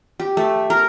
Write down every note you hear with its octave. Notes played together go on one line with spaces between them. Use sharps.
G4
A3
A#4